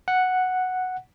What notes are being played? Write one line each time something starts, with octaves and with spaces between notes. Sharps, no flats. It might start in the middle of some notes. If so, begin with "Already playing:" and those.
F#5